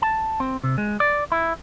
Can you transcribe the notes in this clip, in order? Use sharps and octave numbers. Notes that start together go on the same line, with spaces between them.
A5
C4
C3
G#3
D5
E4